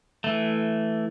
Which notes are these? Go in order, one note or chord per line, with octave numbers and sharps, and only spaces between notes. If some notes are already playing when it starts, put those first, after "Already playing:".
E3 A3